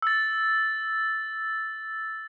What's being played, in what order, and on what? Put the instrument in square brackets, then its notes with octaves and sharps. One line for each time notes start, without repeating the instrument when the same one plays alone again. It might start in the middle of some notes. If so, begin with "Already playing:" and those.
[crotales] E6 A6